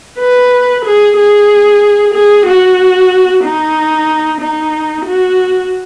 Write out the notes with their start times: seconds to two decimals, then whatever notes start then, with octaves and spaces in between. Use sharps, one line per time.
0.19 B4
0.85 G#4
1.17 G#4
2.14 G#4
2.46 F#4
3.44 D#4
4.40 D#4
5.05 F#4